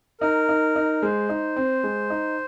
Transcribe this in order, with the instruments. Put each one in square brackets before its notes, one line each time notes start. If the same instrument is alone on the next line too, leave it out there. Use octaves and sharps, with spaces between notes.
[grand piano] D#4 [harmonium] A#4
[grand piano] D#4
D#4
[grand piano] G#3 [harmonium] C5
[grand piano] D#4
C4
G#3
D#4